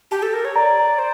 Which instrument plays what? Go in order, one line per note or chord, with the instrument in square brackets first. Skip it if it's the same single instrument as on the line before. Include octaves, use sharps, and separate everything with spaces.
[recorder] G4 [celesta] A5
[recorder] A4
A#4
C#5
[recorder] D5 [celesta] A#5
[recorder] C5